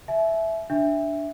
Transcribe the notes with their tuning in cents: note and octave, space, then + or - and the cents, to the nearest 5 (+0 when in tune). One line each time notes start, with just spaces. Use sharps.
E5 +0 G#5 +45
D4 +0 E5 +0